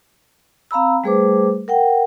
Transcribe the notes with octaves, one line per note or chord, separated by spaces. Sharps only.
C4 F5 A#5 B5 E6
G3 A3 G#4 B4 C5 D6
A#4 F#5 G5